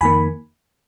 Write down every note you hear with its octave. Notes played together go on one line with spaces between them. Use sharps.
F2 D#3 A#3 G#5 B5